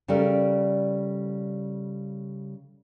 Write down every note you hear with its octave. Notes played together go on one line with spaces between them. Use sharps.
C#3 G3 A4 A#4 D5